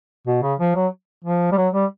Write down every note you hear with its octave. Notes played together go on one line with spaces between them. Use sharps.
B2
C#3
F3
F#3
F3
G3
F#3
G3